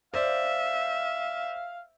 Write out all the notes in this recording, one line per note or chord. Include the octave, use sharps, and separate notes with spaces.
C5 D5 E5 F5